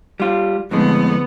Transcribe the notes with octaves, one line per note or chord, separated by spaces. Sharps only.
G3 F4
F2 A2 D3 G#3 B3